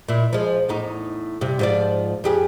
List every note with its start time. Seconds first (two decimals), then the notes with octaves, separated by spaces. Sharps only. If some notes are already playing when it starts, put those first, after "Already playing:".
0.08 A#2 E4
0.33 F3 G#3
0.68 E2 A2 D#4
1.41 G2 C3
1.59 G#2 F3 D5
2.24 F2 G4 G#4